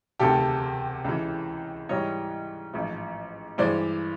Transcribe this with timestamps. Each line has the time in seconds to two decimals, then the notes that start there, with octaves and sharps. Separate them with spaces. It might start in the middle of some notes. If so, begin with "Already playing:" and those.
0.19 E1 D2 C3 D#3 G4 A4
1.04 C#2 C#3 E3
1.89 G#2 E3 G3 C#5 D#5
2.73 A1 G#2 F3
3.58 G2 E3 G#3 C5 D5